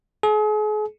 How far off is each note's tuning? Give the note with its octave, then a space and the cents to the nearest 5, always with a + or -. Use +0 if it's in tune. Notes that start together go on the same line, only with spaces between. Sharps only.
G#4 +40